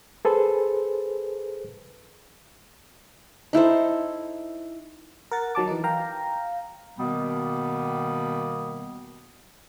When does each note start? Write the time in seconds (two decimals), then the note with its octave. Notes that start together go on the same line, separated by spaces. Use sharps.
0.25 G#4 A4 B4 C5
3.53 D#4 E4 A4 C5
5.32 A#4 F#5 A6
5.55 D#3 F#3 A5 D6
5.67 E3 D#4
5.84 F5 G5 A#5
6.99 B2 D#3 G3 A#3 B3